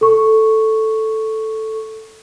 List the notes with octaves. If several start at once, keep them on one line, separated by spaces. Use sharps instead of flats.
A4 C#6